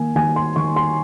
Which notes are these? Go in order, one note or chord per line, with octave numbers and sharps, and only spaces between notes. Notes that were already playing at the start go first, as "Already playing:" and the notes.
Already playing: D#3 A#3 G#5
D#3 G#5
C6
D#3 C#6
C6